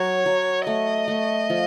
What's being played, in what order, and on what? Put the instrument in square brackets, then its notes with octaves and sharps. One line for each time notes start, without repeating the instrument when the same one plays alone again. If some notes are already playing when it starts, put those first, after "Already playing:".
Already playing: [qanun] F#3 [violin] C#5
[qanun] F#3
[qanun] A3 [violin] D#5
[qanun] A3
F3